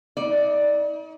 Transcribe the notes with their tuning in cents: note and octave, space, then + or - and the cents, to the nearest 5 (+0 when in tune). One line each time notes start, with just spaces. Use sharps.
D#4 +40 D5 +0